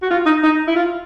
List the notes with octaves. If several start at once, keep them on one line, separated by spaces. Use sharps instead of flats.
F#4
F4
D#4
D#4
E4
F4